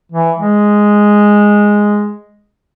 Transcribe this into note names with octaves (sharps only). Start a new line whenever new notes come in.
E3
G#3